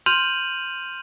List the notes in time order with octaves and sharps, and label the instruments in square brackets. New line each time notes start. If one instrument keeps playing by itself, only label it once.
[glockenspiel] C6 F6 G6 D#7 F7 F#7